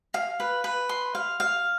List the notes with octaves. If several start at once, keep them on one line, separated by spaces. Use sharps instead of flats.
F5
B4
B4
C6
F5
F5